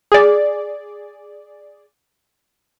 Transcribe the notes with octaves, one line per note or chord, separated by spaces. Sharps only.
G#4 D5